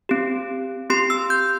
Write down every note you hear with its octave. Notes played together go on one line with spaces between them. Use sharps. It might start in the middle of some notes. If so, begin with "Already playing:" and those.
C4 G4
C4 G4 C6
E6
G6